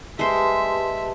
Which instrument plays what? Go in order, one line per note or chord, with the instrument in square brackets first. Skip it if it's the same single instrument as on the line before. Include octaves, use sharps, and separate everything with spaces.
[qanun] G#3 C5 [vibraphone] G4 B4 A5 [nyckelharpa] E5